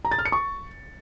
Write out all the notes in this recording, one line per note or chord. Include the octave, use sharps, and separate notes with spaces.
A#5
A6
F6
C#7
C#6